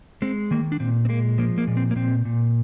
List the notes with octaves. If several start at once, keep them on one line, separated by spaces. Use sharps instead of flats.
G#3 C4
D#3 A#3
D4
A#2 C4
C4
G#3 A#3
F3 A#3
A#3
A#2
C4
A#3
A#2 C4
A#2